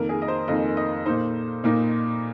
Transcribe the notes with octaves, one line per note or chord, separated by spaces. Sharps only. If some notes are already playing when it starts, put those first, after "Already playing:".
Already playing: F2 D#3 A#3 A#4
G#4
D#5
C5
F2 D#3 A#3 D#5
D#5
A#2 A#3 D#4 C5
A#2 A#3 D#4